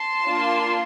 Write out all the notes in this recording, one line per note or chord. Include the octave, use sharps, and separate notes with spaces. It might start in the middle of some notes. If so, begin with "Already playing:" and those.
Already playing: A5 C6
A#3 D4 F4